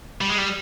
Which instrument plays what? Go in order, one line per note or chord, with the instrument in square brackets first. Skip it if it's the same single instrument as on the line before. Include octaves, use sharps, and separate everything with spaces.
[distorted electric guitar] G3
G#3
G3